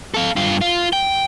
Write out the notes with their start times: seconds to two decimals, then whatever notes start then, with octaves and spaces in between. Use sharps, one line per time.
0.14 A4 F5
0.36 G2 F4
0.61 F4
0.93 G5